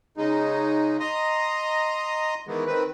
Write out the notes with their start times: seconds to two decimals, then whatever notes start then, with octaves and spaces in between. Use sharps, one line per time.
0.17 C#3 G#3 D#4
1.00 D#5 A#5 C6
2.48 D#3 E3 G#3 B3
2.67 D#3 C4 B4